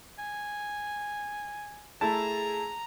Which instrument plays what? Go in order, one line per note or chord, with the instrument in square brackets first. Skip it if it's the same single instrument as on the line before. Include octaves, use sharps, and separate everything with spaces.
[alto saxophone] G#5
[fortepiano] A3 E4 A5 [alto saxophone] G#4 [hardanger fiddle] A#5